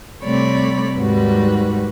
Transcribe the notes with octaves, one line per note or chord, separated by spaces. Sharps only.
C3 G3 A3 C#5 D5 B5
D#2 G#2 G3 F#4 B4